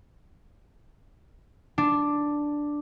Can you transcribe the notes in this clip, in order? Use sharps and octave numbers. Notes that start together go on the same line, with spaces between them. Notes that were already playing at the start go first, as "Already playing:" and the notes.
D4